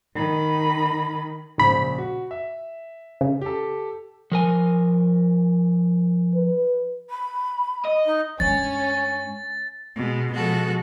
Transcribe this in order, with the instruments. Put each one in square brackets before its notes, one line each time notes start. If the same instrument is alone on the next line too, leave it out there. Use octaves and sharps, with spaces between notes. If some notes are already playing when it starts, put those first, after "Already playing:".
[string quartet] D#3 B5
[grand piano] A#1 C#3 C5 [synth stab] G#2 B5
[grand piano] F#4
E5
[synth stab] C#3
[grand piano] G4 A4
[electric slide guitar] F3 A#4 G#5
[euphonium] B4
[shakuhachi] B5
[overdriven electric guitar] D#5
[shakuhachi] D#4
[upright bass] G2 G#3 [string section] C#4 [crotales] A6
[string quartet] B2 G#3
B2 F3 G#3 F#4 A4